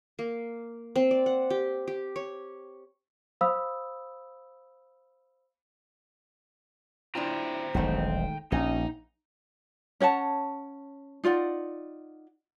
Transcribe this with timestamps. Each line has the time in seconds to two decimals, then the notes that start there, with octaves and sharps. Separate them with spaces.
0.19 A#3
0.96 C4
1.11 D5
1.26 F#5
1.50 G4
1.88 G4
2.16 C#5
3.41 C5 F5 B5 D#6 E6
7.15 D4 E4 F4 C5 G5 A#5
7.74 E1 B1 D#3 G#3 A3
8.52 A#1 C#4 D#4
10.00 C#4 C#5 F#5 A5
11.24 D#4 F4 D5 F#5